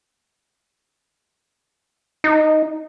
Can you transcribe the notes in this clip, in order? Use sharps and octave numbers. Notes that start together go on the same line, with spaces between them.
D#4